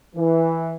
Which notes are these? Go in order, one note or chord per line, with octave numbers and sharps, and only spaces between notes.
E3